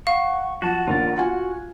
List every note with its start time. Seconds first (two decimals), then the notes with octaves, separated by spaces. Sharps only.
0.07 F5 F#5 C#6
0.62 F3 F#4 F#5 A5
0.88 A#1 D#2 F4 A#4 D5
1.18 F4 F#4 G#5